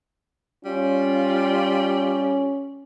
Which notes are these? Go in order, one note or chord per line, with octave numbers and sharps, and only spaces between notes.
G3 C#4 F4